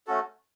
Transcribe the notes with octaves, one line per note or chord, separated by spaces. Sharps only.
A3 C#4 F#4 A4